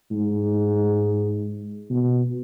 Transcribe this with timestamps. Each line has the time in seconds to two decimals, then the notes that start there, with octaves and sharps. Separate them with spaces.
0.11 G#2
1.90 B2